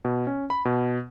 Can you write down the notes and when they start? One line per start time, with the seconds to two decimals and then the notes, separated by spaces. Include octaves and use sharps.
0.05 B2
0.27 C#4
0.50 B5
0.65 B2